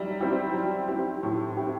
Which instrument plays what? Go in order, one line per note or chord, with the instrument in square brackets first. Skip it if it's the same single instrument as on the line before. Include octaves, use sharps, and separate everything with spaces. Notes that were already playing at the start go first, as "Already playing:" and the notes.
Already playing: [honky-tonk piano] F#3 E4 G4 [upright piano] G3
[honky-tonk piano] C4 E4 G4
F#3
C4 E4 G4
[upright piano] A2 [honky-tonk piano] F#3
[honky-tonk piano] C4 E4 G4